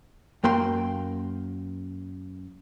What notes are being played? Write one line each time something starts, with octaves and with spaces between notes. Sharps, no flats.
F#2 A#3 G5 C6